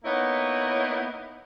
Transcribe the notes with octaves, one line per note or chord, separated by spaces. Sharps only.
A#3 B3 D#4 E4 C#5